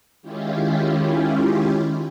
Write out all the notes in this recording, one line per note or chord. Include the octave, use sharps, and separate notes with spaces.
D#3 G#3 C#4 E4 F4 G4